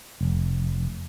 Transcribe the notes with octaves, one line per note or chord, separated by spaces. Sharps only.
F1